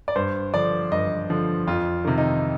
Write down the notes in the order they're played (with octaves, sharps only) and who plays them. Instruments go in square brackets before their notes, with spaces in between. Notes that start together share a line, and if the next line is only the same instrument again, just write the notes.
[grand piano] D5
G2 C5
D3 F3 D5
G2 D#5
D3 F3
F2 F4
C3 D#3
D#4